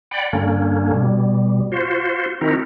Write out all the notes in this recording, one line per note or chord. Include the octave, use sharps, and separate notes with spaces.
D5 F#5 G5 B5
G2 D3 A#3 C#4
B2 G3
F4 F#4 C5
D#3 C4 D#4 E4 F#4 A#4